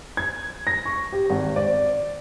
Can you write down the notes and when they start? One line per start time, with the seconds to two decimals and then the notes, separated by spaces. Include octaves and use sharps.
0.17 G#6
0.67 A#6
0.85 C#6
1.12 G4
1.30 G#1
1.56 D5